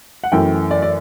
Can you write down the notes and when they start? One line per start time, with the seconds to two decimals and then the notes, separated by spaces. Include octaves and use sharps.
0.24 F#5
0.32 F#2 E3 A3 G5
0.71 D5
0.82 D5